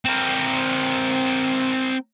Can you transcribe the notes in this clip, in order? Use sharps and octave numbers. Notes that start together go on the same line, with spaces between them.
C4 A#4